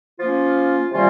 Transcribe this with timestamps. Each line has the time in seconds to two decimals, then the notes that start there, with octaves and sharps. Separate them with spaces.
0.19 F3 A#3 C#4 F4
0.91 C3 D#3 G3 A#3 C#4 F4